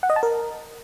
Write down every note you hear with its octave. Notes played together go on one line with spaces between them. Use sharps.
F#5
D#5
A5
A#4